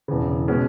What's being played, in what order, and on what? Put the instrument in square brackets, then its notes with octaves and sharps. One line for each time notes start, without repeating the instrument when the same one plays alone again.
[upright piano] E1 E2 C#3
B2 G#3 C#4